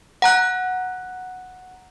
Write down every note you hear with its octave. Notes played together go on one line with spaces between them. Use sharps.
F#5 A#5 F#6